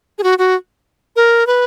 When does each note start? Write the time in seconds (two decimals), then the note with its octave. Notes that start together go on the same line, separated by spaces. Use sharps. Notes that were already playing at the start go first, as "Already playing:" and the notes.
0.18 G#4
0.23 F#4
0.39 F#4
1.16 A#4
1.47 B4